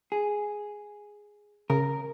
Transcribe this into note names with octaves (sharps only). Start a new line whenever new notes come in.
G#4
C#3 A#4